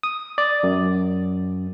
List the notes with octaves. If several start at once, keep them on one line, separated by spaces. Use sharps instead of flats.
D#6
D5
F#2